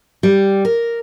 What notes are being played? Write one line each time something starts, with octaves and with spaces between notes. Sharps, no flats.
G3
A#4